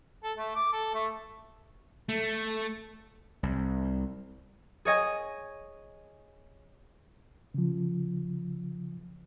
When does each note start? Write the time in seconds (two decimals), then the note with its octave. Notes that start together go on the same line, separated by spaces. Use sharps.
0.23 A4
0.37 A3
0.55 D6
0.73 A4
0.94 A3
2.09 A3
3.43 C2
4.85 G#4 C#5 D#5 G#5
7.54 C#3 F3